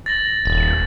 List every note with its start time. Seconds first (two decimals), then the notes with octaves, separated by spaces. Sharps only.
0.06 A6 A#6 F#7
0.45 D#1